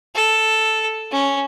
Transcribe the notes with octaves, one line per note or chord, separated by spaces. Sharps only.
A4
C#4